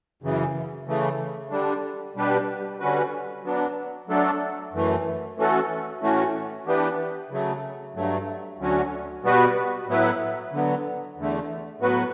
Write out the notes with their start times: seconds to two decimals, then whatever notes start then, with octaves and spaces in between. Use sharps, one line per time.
0.22 F#2 C#3 E3
0.86 C#3 E3 A3
1.51 D3 G3 D4
2.15 B2 G3 D4 G4 B4
2.80 D3 G3 C#4 F#4 B4
3.44 F#3 B3 D4
4.08 F#3 A3 D4 A4
4.73 F#2 E3 A3
5.37 E3 A3 C#4 F#4 A4
6.01 A2 E3 A3 C#4 F#4
6.66 E3 B3 D4 G4 B4
7.30 C#3 F#3 A3
7.95 G2 F#3 A3
8.59 D2 D3 F#3 C#4 F#4
9.23 B2 G3 B3 F#4 B4
9.88 A2 F#3 B3 E4 B4
10.52 D3 F#3 B3
11.17 E2 D3 A3
11.80 A2 F#3 B3 F#4 B4